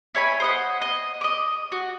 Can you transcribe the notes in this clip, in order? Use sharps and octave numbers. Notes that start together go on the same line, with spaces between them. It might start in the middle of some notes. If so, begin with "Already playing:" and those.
E4 C#5 G#5 B5
C5 D#5 F#5
D#5
D#5 D6
F#4